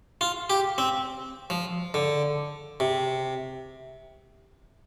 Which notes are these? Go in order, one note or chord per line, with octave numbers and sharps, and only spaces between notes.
F4
G4
C4
F3
D3
C3